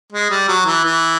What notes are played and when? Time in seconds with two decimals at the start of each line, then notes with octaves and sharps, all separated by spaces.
0.12 G#3
0.30 G3
0.48 F#3
0.65 E3
0.84 E3